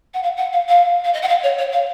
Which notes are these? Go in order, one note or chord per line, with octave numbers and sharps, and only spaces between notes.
F#5
F5
F#5
F5
F5
F5
D#5
F#5
F5
C#5
C#5
F5